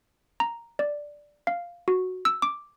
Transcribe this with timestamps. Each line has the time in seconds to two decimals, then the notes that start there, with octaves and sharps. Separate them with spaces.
0.40 A#5
0.79 D5
1.47 F5
1.88 F#4
2.25 E6
2.42 D6